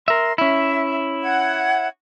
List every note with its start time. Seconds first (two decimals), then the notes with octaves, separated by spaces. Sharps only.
0.08 A#4 E5 C6
0.38 C#4 E4 E5
1.22 F#5 G#6